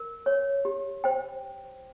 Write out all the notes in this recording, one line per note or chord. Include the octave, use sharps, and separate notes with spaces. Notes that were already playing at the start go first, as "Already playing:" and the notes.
Already playing: A#4
C#5
G4
C5 G5